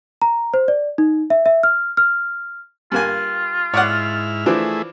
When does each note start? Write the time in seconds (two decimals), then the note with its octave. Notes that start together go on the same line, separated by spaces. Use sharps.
0.22 A#5
0.54 C5
0.68 D5
0.98 D#4
1.30 E5
1.46 E5
1.63 F6
1.97 F6
2.92 G2 A#3 F4 G#5
3.74 G#2 E4 C#5 D5 F#5 F6
4.46 E3 F3 A3 D4 E4 G#4